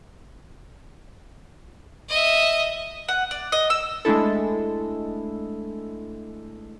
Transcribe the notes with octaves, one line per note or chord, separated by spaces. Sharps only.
D#5 E5
F#5
D5
D#5
E6
G#3 A3 D4 E4 A4